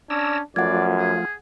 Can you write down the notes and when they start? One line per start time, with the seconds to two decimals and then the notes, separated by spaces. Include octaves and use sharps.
0.10 C#4 D4 D5 A#5 E6
0.56 F#2 F3 A3 F4 D5 F#5 G#6
0.98 G#4